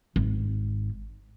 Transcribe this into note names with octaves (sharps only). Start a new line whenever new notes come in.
G#1